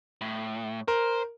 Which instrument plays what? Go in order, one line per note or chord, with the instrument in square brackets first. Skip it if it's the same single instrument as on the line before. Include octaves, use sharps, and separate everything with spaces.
[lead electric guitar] A2
[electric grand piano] A#4 [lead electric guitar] C5